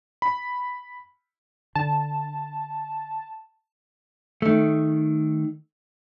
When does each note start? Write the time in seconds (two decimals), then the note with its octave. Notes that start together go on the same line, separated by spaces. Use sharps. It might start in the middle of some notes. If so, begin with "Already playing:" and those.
0.22 B5
1.75 D3 A5
4.42 D#3 A3